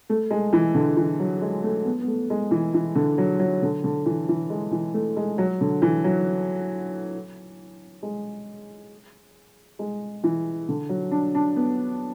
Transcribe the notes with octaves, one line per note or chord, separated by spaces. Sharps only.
A3
G#3
E3
D3
E3
F#3
G#3
A3
B3
B3
A3
G#3
E3
E3
D3
F#3
F#3
D3
D3
E3
E3
G#3
E3
A3
G#3
F#3
D3
E3
F#3
G#3
G#3
E3
D3
F#3
D4
D4
B3